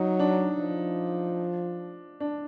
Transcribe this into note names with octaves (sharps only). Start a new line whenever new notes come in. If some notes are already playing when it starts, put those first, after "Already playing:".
Already playing: F#3 D#4
D4
F3
D4